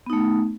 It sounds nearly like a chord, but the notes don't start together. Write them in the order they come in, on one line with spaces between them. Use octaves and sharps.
B3 D#4 A3